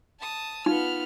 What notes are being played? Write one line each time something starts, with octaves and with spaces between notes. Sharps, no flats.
A5 D#6
B3 D#4 F4 F6